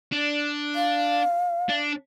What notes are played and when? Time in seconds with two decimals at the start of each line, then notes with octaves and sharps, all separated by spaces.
0.12 D4
0.75 F5
1.69 D4